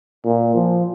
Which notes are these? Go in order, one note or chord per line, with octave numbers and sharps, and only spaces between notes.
A#2
F3